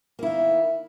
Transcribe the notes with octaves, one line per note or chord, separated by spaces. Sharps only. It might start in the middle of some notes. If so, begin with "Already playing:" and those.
D#3 A#3 E4